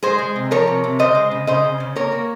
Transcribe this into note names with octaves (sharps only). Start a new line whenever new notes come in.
G#3 G#4 C5
G#3
C3
F3 A#4 C#5
C3
C3
C#3 C5 D#5
G#3
C#3
C#3 C5 D#5
C#3
C#3
A#3 A#4 C#5
A#3